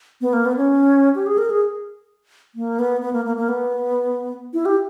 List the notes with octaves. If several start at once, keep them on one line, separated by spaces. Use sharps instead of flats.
B3
A#3
B3
C#4
G4
G#4
A#4
G#4
A#3
B3
B3
A#3
A#3
A#3
B3
E4
G4